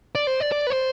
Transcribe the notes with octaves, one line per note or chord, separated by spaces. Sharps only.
D5
C5
D5
D5
B4
C5